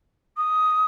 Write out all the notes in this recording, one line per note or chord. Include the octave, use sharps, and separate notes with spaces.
D#6